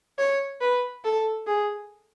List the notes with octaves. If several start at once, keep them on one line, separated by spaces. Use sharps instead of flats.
C#5
B4
A4
G#4